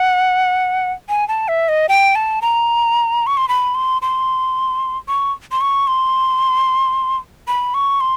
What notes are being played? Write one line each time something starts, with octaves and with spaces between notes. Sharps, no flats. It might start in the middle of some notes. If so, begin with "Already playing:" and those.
Already playing: F#5
G#5
A5
E5
D#5
G5
A5
A#5
C#6
C6
B5
C6
C6
C#6
C6
C#6
C6
B5
C#6
C6